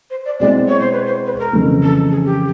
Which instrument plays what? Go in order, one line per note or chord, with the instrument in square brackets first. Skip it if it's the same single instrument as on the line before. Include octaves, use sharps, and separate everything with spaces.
[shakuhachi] C5
D5
[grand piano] B2 G#3 C4 E4 [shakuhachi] D5
[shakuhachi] C#5
C5
B4
C5
B4
A#4
[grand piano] F2 C#3 E3 A3
[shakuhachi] A4
G#4
G4